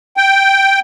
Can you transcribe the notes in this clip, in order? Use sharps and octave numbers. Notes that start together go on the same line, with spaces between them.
G5